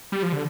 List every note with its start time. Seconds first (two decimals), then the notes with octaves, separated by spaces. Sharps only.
0.12 G3
0.23 F3
0.33 D3